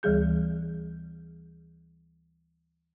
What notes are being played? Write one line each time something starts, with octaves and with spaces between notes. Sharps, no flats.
D2 E3 G3 G#4 G6